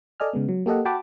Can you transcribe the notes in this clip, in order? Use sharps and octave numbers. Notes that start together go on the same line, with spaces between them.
A4 D5 D#5 G#5 F6
C#3 G#3 B3
F#3
A#3 G4 A4 D#5 F#5
F#4 F#5 G5 A5 B5 D6